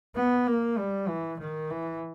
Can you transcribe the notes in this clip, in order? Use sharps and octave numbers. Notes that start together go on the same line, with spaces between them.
B3
A#3
G3
E3
D#3
E3